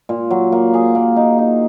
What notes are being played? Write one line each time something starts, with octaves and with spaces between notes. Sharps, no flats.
A#2
F#3
A#3
G#4
A#3
D#4
D#4